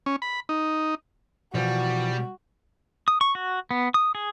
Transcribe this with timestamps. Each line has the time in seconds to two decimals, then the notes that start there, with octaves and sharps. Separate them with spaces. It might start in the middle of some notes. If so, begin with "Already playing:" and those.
0.06 C#4
0.22 B5
0.49 D#4
1.55 B2 E3 F3 G3 F#4 C5
3.08 D#6
3.21 C#6
3.35 F#4
3.71 B3
3.94 D#6
4.15 G#4